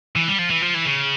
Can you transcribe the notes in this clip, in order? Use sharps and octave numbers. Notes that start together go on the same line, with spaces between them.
E3
G3
F3
E3
F3
E3
C#3